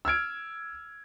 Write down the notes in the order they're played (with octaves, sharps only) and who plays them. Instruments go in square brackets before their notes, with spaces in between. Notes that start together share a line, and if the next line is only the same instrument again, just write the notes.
[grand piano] E6 F6 G#6 D7